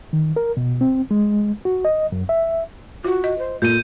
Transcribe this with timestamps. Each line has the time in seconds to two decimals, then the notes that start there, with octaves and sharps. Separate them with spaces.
0.13 D#3
0.36 A#4
0.57 B2
0.81 C4
1.11 G#3
1.65 F#4
1.85 D#5
2.12 F#2
2.29 E5
3.05 F4 F#4
3.24 D#5
3.38 C5
3.62 A#2 A4 G6 D#7